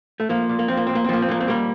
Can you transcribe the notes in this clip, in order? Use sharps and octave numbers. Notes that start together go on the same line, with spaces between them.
A3
F3 A#3
A#2
A#3
F3 C4
A#3
A#2 C4
A#3
C4
F3 A#3
C4
A#2 A#3
C4
G3 A#3